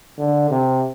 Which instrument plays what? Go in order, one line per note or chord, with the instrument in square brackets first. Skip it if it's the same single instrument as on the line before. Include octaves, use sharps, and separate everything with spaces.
[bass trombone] D3
C3